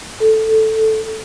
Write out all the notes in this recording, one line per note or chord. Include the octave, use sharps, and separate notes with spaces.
A4